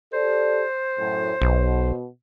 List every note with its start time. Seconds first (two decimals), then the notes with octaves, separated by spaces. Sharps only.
0.13 G4 A4 C5 D5
0.99 F#2 A2
1.42 B1 B2